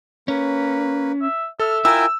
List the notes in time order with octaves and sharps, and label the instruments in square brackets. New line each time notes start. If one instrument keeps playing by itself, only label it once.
[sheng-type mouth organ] A#3 B4 [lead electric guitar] C#4
[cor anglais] E5
[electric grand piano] A4 [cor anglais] E5 [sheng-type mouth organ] F6
[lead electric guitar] E4 F4 [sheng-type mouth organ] A#4 G5 G#5 [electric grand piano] E6